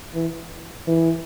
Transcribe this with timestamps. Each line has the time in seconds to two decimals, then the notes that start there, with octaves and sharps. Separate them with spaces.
0.15 E3
0.88 E3